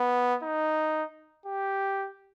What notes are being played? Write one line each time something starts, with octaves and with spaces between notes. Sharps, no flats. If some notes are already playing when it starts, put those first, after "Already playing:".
Already playing: B3
D#4
G4